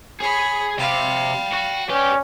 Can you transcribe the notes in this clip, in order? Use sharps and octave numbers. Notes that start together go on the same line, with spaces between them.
G#4 C#5 G#5 B5
C3 F5 G5 B5
F#4
C#4 G4 B4 D5